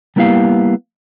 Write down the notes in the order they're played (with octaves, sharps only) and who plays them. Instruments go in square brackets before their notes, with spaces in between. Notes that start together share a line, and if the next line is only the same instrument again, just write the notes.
[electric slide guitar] G3 A#3 B3 E4 G4 F5